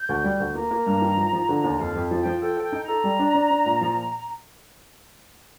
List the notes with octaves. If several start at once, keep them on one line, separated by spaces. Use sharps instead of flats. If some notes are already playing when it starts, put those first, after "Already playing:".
Already playing: G6
D2
G3
D2
A#3 A#5
A#3
G2
D#3
F3
F3
D3
D#2
F2 F5
F2
F3
F3 G5
A4 G5
A4
G5
D#4
A#5
A4
G3
D4
D4
D4
A#2
F3